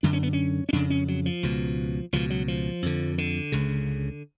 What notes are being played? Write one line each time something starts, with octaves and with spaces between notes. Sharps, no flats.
F#2 D3 D4
C#4
B3
C#4
C#4
F2 C#3 D4
C#4
F#3
F3
C#2 B2
C#2 B2 F3
F#3
F3
F2 D3
D3
C#2 C#3